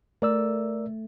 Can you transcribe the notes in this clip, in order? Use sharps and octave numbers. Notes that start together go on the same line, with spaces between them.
A3 A#4 D5 E6